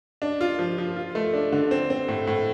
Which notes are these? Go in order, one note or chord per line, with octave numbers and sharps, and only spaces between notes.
D4
F4
F3
F3
F4
A3
D4
D3
C4
C4
A2
A2